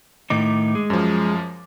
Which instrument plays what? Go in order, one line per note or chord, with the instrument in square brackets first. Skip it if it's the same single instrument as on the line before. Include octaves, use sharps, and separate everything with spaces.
[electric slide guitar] A2 D#3 D#4 [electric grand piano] D6
[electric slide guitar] G#3
[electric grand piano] F#2 F3